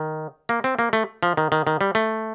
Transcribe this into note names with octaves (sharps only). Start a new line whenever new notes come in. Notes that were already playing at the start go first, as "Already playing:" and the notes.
Already playing: D#3
A#3
C4
A#3
A3
F3
D#3
D#3
D#3
G3
A3